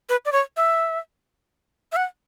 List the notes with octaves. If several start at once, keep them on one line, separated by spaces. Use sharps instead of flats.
B4
D5
C#5
E5
E5
F#5